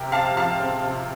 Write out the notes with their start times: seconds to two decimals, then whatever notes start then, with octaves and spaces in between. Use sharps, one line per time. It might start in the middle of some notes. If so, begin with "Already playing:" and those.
Already playing: C3 C4 G4 A#4
0.12 C3 F5 A5
0.36 F3 F5 A5
0.60 C4
0.84 C3